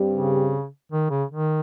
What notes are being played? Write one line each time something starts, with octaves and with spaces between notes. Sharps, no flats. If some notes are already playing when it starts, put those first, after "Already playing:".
Already playing: G2 G3 C4 G4
C#3
D#3
C#3
D#3